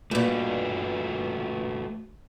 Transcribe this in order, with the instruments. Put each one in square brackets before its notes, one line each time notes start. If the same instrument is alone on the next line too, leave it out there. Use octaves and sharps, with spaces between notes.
[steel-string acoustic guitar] G2 A#2 [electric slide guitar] A3 F#4 B4